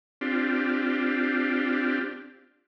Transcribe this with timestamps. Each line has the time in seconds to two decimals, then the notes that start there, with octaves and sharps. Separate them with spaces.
0.21 C4 D4 F4 G4